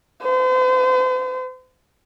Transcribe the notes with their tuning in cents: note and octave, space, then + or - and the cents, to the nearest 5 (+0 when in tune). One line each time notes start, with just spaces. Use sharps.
C5 -40